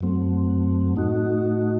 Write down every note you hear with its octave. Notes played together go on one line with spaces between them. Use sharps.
F#2 F#3 A3 C4
A2 A3 D#4 F#4